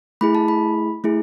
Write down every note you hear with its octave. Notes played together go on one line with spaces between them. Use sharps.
A3 E4 G#4 B5
A5
B5
A3 E4 G#4